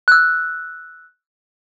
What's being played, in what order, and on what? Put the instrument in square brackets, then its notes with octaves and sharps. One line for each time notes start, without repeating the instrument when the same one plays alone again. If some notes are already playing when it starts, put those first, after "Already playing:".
[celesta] E6 F#6